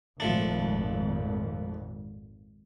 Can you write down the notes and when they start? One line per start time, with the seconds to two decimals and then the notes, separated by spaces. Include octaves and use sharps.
0.20 G#1 F2 A#2 F3 A3 D4